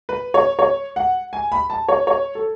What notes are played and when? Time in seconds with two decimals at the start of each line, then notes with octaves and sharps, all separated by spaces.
0.09 B4
0.34 C#5
0.59 C#5
0.96 F#5
1.33 G#5
1.52 B5
1.70 A5
1.89 C#5
2.07 C#5
2.35 A4